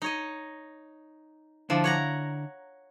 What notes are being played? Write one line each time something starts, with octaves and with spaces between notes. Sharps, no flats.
D#4 C#5 D#5
D3 F3 D4 E4
C#5 F#5 A#5